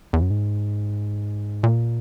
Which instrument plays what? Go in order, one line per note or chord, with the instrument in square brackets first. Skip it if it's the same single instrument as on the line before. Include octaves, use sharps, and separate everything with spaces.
[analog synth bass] E2
F#2
G#2
A#2